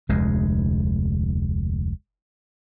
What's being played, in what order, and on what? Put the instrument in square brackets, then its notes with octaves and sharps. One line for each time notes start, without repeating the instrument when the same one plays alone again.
[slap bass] F1 D2 G#3